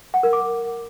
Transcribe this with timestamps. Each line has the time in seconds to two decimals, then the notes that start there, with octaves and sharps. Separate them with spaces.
0.14 F#5
0.23 A#4
0.33 D6